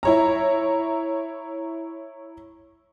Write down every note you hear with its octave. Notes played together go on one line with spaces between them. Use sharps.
E4 C#5 A#5